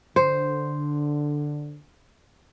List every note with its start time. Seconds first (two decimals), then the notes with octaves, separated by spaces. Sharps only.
0.16 D3 C5